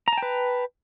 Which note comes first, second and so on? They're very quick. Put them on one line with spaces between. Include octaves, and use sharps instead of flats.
A#5 A5 G5 B4